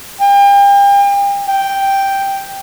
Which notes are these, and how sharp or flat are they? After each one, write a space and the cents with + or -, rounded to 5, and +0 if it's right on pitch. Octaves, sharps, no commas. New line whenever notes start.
G5 +40
G5 +0